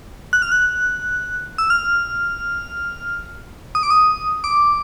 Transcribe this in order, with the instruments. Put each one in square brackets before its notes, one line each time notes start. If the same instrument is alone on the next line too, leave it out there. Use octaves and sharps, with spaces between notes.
[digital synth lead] F#6
F6
F#6
E6
F6
D#6
D6
D#6
D6